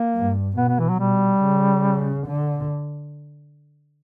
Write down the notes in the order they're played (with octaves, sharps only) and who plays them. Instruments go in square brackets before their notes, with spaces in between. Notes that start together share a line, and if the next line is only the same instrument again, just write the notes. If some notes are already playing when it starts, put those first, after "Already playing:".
Already playing: [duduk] A#3
[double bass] G2
[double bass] B2 [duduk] B3
[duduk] B3
E3
F#3
[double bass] B2 [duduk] G3
[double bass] C#3
D3